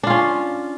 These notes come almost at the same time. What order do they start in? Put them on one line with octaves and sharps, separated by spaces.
D4 F4 C#4